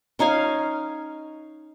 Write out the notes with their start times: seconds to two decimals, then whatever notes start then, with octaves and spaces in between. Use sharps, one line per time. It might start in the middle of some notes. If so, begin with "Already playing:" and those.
0.19 C#4 D#4 F5 G#5